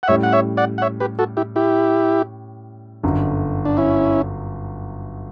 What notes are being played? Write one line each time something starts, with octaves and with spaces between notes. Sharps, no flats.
F#5
A2 G3 C#4 C#5 E5
F#5
C#5 E5
D5 F#5
F#5
C#5 E5
G4 B4
F#4 A4
E4 G4
E4 G4
G1 F#2 D3 F#3
D4
C#4 E4